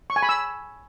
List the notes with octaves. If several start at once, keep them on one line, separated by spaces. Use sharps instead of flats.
C#6
G#5
B5
E6